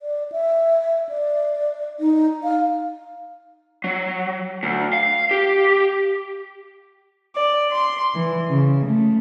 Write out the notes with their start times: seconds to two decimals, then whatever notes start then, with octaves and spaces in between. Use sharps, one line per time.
0.02 D5
0.32 E5
1.09 D5
2.00 D#4
2.44 F5
3.84 F#3
4.63 D2
4.93 F5
5.31 G4
7.35 D5
7.71 C6
8.15 E3
8.50 C#3
8.86 A3